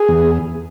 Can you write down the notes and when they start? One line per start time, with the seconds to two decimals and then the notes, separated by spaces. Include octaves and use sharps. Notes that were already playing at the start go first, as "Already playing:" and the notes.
Already playing: G#4
0.08 E2